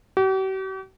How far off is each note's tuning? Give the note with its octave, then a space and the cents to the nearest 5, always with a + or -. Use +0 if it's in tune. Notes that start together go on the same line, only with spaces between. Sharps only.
G4 -45